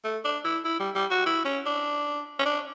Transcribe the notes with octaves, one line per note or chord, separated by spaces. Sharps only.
A3
D4
E4
E4
G3
G3
F#4
E4
C#4
D4
C#4
D4